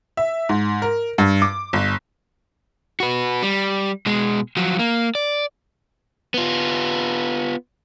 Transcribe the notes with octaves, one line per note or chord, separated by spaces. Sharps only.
E5
G#2
A#4
G2
D6
G1
F#4 B4
G3
B2 G#3
F3 F#3
A#3
D5
B3 F4